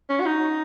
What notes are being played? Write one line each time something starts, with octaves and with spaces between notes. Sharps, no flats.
C#4
F#4
D#4